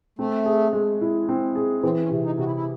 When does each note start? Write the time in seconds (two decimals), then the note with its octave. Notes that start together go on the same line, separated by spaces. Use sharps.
0.19 A3 C4
0.45 G#4
0.73 G#3
1.01 E4
1.29 C4
1.55 G#4
1.83 E3 C4
2.03 C#4
2.11 C3
2.25 D#4
2.38 C3 F#4
2.45 E4
2.55 E4